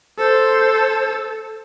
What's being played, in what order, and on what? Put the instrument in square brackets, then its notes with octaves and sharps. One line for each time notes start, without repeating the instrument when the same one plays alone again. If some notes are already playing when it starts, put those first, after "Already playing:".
[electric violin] A4 [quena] C5